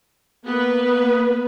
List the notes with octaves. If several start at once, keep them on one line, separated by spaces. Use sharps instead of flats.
A#3 B3 B4